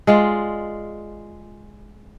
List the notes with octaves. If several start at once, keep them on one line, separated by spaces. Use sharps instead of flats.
G#3 F4 D5